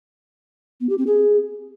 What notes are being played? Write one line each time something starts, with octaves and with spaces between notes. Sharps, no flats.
B3
G4
C4
G#4